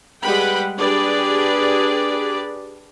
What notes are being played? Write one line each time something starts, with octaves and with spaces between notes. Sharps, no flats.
G3 G#3 B4 F#5 G5 B5
D4 G4 G#4 B4 D5